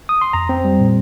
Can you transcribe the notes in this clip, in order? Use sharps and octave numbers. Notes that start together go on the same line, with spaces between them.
D#6
C6
F2 A#5
C4
G3
A#2